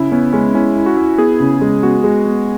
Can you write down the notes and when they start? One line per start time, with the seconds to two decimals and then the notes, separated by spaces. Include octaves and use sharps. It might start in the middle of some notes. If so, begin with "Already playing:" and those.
Already playing: C#3 E4
0.12 B3 C#4
0.33 G#3 C#4
0.54 C#4 E4
0.76 E4
0.86 F#4
0.97 E4
1.18 B3 G#4
1.40 C#3
1.61 G#3
1.83 B3 F#4
2.04 G#3
2.26 B3